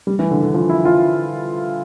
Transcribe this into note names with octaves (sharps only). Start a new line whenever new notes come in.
G3
E3
D3
D3
F3
E4
F4